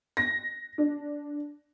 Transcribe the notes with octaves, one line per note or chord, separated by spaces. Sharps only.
A#6
D4